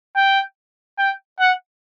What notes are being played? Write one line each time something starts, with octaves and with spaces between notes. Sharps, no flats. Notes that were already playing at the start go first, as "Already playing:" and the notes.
G5
G5
F#5